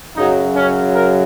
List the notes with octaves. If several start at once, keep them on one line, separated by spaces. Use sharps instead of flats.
F#2 C#3 F#3 D#4
C#4
A#4